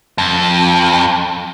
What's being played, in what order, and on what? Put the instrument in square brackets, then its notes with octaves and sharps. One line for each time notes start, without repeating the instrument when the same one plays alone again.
[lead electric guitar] F2